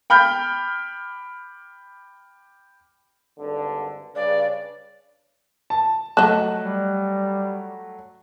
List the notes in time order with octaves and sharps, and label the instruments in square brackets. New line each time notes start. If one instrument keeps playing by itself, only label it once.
[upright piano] G5 B5 F6 G6
[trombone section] G#1 G2 D3
[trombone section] G2 C#3 [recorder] D5
[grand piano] A5
[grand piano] F#3 A3 F#6 [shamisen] D#5 A5
[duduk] G3